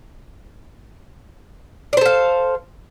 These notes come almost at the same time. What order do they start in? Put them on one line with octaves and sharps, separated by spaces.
D5 C5 A4 F5